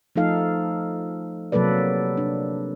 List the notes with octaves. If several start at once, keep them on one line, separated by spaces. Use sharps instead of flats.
F3 A3 D#4 A4 F5
C3 F#3 A#3 A4 B4 D5
D4